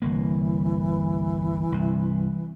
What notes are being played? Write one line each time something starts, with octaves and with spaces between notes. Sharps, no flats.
G1 C2 E3 A#3
C2 G2